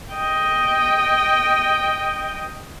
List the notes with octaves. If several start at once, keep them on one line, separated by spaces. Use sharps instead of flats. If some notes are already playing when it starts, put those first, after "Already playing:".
D#5 G5